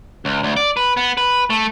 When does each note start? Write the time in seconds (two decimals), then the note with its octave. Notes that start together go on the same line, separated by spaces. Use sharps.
0.25 C#2
0.43 D2
0.57 D5
0.77 B4
0.97 B3
1.17 B4
1.50 A3